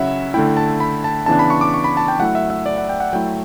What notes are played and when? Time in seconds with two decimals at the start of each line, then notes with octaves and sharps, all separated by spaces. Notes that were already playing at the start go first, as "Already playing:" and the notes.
Already playing: C#3 F#3 C#4 E4 E5 F#5
0.34 D3 A3 E4 G5
0.57 A5
0.80 B5
1.04 A5
1.26 C#3 E3 B3 D4 A5
1.39 B5
1.50 C#6
1.61 D6
1.74 C#6
1.84 B5
1.97 A5
2.08 G5
2.20 F#3 A3 E4 F#5
2.35 E5
2.50 E5
2.66 D5
2.78 F#5
2.89 G5
3.00 F#5
3.13 F#3 A3 E4 G5